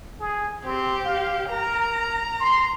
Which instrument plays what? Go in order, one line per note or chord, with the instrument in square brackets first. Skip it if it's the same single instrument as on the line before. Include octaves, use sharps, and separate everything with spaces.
[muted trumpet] G#4
[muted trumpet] C4 [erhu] G4
[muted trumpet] F5
[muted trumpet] A#4 [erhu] A#5
[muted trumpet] C6